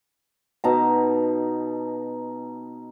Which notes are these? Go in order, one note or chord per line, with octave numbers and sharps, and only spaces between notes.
B2 D#4 A5 A#5